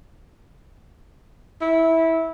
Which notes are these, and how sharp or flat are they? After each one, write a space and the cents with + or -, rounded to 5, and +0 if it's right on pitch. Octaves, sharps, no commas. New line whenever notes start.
E4 -15